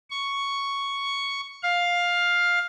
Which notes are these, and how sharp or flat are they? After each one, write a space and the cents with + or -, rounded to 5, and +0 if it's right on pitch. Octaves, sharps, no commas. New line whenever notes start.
C#6 +5
F5 +10